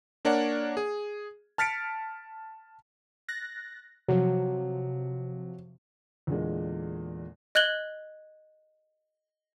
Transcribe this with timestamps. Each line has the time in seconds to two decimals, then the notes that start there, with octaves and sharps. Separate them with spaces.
0.25 A#3 D4 A#4 C#5 D5 F#5
0.77 G#4
1.58 A5 F6 A6 B6 C#7 D7
3.29 F#6 A6 A#6
4.08 C3 F3 F#3
6.27 E2 A#2 D3 G#3
7.55 D#5 F#6 G#6 F#7 G7